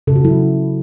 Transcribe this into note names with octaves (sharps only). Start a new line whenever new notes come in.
C#3 A4
F#4
F#3 C#4 E4